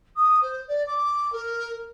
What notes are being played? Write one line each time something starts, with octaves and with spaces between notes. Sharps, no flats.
D#6
C5
D5
D6
A#4